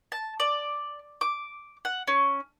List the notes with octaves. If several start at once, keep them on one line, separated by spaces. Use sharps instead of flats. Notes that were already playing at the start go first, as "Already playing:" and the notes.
A5
D5
D6
F#5
C#4